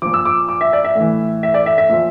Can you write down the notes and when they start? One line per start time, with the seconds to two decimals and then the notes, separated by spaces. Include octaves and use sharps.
0.02 A#2 F3 D6
0.14 E6
0.26 D6
0.49 D6
0.61 E5
0.73 D5
0.85 E5
0.96 A2 E3
1.43 E5
1.54 D5
1.66 E5
1.78 E5
1.89 A#2 F3